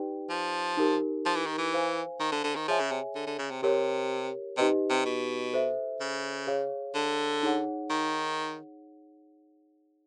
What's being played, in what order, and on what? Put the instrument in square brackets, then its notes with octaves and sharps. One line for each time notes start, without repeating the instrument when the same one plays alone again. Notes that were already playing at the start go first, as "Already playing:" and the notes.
Already playing: [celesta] D#4 G4 B4 D5 G5
[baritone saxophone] F3
[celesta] D#4 G4 A#4
[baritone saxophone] F3
E3
D#3
E3
[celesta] C5 F5 G#5
[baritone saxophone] D#3
D3
D3
D#3
[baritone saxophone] F3 [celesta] G#4 C#5 E5 G#5
[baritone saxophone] C#3
C3
D3
D3
C#3
C3
[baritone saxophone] C3 [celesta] G4 A#4 C#5
[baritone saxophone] C3 [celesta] D#4 G4 B4 D#5
[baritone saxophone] C3
B2
[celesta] A4 C5 E5
[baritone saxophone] C#3
[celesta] G#4 C#5 F5
[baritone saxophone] D3
[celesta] D#4 G#4 C#5 F#5
[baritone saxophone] D#3